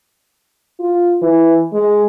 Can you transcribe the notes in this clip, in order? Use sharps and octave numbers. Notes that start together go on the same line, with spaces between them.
F4
E3
G#3